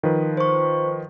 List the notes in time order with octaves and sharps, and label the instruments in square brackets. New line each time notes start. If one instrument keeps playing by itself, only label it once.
[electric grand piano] D#3 F3 B4
[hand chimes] C5 C#6